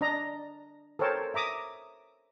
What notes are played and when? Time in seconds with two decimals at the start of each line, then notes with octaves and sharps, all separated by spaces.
0.01 D4 D#5 A#5
0.99 A4 A#4 C5 C#5 G5 A5
1.34 E5 A#5 D6 D#6